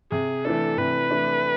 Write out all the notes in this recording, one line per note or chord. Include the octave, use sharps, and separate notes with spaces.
C3 G#4
E3 A3 D4 A4
C3 B4
E3 A3 D4